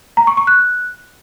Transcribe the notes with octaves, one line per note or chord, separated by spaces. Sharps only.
A#5
C#6
C#6
F#6